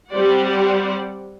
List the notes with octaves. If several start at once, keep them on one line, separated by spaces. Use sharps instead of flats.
G3 C4 G4 C5 D5 F#5